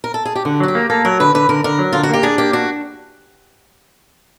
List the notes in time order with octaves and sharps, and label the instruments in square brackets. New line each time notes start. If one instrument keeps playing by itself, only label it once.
[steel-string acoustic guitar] A#4
A4
G#4
G4
[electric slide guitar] D3 [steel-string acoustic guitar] F#4
[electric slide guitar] F#3 [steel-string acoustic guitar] F#4
[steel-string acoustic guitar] G4
[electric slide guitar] A#3
[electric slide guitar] A#3 [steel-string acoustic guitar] A4
[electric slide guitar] F#3 [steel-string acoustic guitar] A#4
[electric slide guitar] D3 [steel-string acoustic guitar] B4
[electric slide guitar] D3 [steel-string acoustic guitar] B4
[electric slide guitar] D3 [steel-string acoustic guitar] A#4
[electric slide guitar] D3 [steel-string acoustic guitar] A#4
[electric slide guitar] F#3
[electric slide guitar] D3 [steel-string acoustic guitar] F4
[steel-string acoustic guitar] F#4
[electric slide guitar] A#3 [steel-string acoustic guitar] G4
[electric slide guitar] D4 [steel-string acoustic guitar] G#4
[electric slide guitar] A#3 [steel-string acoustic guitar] G4
[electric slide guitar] D4 [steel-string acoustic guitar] F#4